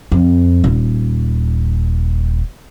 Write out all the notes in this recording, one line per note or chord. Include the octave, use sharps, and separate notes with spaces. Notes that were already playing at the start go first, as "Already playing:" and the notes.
F2
D#1